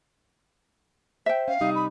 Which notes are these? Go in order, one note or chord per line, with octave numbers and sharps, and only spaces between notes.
C5 E5 G5
C#4 F5
C3 G3 D#4 D#6
B5